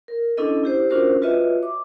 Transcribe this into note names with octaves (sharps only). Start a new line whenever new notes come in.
A#4
C#4 D4 E4 A4 D#5
E4 G4 C5
C#4 D4 F4 F#4 A#4 C5
F4 F#4 B4 C#5 D#5 E5
D6